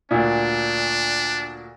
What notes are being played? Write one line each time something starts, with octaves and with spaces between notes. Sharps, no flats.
D2 A#2 D4